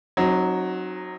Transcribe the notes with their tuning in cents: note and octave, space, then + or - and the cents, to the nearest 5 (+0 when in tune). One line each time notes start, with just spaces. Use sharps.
F#3 +0 C4 +40 D#4 +0